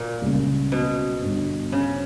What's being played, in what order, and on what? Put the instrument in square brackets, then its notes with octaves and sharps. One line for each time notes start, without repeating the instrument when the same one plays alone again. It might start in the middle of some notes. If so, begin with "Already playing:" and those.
Already playing: [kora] A#2
[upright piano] C#2 C#3 G3 A#3
[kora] B2
[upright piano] G1 G2 G3
[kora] C#3